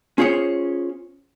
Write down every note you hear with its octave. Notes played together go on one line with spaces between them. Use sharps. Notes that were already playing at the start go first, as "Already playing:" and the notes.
C#4 F4 G#4 C5 C#5